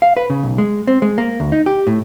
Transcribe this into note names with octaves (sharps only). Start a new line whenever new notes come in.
F5
B4
C#3
B1
G#3
C4
G#3
A#3
D2
D#4
G4
A2